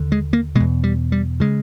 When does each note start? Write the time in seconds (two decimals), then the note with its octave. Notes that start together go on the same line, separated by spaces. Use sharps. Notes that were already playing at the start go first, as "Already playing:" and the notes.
Already playing: D#2 D3
0.12 G#3
0.33 A#3
0.55 B2 G#3
0.60 E2
0.84 G3
1.12 G3
1.40 C#3 G#3